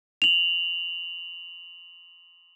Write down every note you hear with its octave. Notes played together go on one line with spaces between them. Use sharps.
F7 F#7